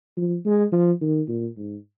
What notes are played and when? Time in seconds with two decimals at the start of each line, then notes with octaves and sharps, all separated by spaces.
0.17 F3
0.45 G#3
0.72 F3
1.01 D#3
1.28 A#2
1.57 G#2